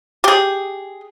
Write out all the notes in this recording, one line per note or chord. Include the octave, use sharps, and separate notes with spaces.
G4 G#4